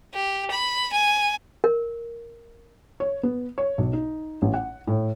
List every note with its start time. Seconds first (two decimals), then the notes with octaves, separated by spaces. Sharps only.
0.14 G4
0.51 B5
0.93 G#5
1.64 A#4
3.00 C#5
3.23 B3
3.58 C#5
3.78 B1
3.93 D#4
4.42 A1
4.54 F#5
4.87 A2